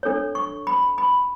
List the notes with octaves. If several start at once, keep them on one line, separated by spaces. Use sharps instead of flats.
D4 A4 C#5
C#6
B5
B5